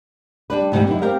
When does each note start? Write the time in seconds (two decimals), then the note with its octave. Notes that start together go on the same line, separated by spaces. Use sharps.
0.50 G3 D4 B4
0.72 D2 G#2 C3 E3 G3
0.86 F#2 D#4 E4
1.02 C4 G4 A#4 F5